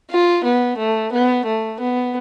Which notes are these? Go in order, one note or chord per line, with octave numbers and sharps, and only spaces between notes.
F4
B3
A3
B3
A3
B3